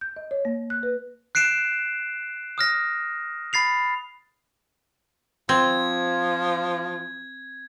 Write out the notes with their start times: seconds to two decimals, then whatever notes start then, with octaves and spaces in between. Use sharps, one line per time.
0.01 G6
0.16 D#5
0.31 C#5
0.45 A#3
0.70 F#6
0.83 B4
1.35 F#6 C7 D7 E7
2.58 D#6 F6 A#6
3.53 B5 A6 C7 F7
5.49 F3 C4 G#6